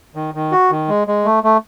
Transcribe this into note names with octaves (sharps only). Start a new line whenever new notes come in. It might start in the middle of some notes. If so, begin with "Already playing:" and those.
D#3
D#3
F#4
D#3
G#3
G#3
A3
A3